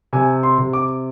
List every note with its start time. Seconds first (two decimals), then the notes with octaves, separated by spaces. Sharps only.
0.13 C3 G#5
0.43 C6
0.58 C3
0.73 D6